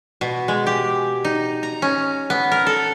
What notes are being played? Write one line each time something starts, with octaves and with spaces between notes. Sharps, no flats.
B2
G#3
G4
D#4
A#5
C#4
B3
A#4
A4